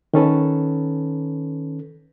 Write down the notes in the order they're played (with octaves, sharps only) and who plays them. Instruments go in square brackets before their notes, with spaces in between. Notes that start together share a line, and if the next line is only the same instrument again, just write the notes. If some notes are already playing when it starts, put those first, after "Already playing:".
[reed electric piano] D#3 C#4 A4 B4